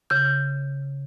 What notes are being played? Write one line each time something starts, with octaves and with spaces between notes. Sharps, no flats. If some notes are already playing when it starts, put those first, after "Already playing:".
C#3 G6